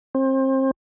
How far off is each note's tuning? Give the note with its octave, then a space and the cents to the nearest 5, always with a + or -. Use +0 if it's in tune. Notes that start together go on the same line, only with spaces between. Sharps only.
C4 +30